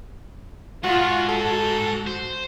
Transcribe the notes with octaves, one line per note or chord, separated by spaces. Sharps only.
G#2 F4 F#4
F#4 A4
C5